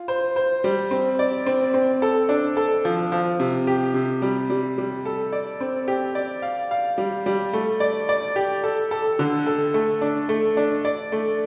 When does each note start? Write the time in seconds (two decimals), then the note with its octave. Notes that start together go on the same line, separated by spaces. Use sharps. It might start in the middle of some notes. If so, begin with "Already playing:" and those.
Already playing: F4
0.08 C5
0.36 C5
0.64 G3
0.91 C4
1.19 D5
1.46 C4
1.74 C4
2.02 A4
2.29 D4
2.57 A4
2.85 F3
3.12 F3
3.40 C3
3.67 G4
3.94 C3
4.22 G3
4.50 G3
4.78 G3
5.05 A4
5.32 D5
5.61 C4
5.88 G4
6.15 D5
6.42 F5
6.71 F5
6.98 G3
7.26 G3
7.53 A3
7.80 D5
8.09 D5
8.36 G4
8.64 A4
8.91 A4
9.19 D3
9.47 A4
9.74 A3
10.01 D4
10.29 A3
10.57 D4
10.85 D5
11.12 A3